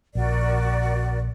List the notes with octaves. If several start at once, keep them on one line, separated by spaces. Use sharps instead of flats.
A#1 F#4 A#4 D5